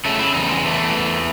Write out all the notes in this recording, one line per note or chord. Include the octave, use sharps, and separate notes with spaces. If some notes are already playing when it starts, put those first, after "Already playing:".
C#3 A3
E4
E2 D#4
G#3
E3 A3
E2